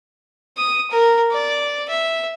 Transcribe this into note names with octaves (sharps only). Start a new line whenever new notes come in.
D#6
A#4
D5
E5